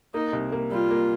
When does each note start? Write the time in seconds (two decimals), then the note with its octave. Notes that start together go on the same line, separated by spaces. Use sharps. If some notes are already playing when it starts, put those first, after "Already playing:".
0.14 A#3 D#4
0.33 C2
0.52 A#3
0.71 G3 F4
0.91 A#3